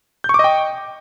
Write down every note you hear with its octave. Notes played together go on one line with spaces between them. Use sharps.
D#5 G5 C#6 D6 G6